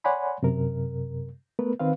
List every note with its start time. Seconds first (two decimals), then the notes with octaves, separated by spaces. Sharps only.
0.04 C#5 D5 F#5 G#5 B5 C6
0.43 F#2 C3 A#4
1.59 A3 B3 A#4 B4
1.80 D#3 C4 B4 F5